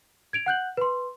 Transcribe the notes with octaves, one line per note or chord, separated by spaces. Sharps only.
G#6 D7 F7
F#5 F#6 G6 F#7
B4 C6